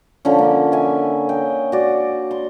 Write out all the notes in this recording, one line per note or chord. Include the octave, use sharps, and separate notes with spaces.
D3 F3 C#4
A#3
E5 G#5
D#5 G5
F#4 D5
C6